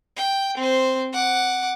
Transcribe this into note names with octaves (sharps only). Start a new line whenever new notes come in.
G5
C4 C5
F#5 D6